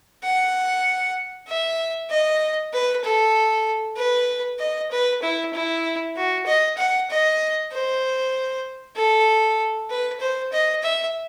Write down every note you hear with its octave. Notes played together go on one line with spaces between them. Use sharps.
F#5
E5
D#5
B4
A4
B4
D#5
B4
E4
E4
F#4
D#5
F#5
D#5
C5
A4
B4
C5
D#5
E5